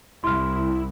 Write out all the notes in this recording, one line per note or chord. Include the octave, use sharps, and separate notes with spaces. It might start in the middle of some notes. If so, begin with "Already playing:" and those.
C2 E4 C6 F6